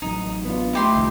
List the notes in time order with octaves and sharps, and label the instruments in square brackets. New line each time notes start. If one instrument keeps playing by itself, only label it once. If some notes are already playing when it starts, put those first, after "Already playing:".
[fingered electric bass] A1 F#3 [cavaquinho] D#4
[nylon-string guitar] B3 D4 F4
[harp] A3 D#5 [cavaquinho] E4 G4 C6
[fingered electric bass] C2 [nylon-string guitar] F2 D#3 F3